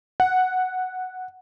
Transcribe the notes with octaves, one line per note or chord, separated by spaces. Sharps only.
F#5